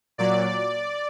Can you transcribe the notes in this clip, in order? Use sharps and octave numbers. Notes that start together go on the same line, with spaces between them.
A#2 F#3 D5